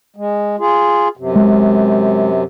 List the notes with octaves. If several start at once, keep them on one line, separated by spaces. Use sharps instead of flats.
G#3
F4 G#4
F#2 C3
G#3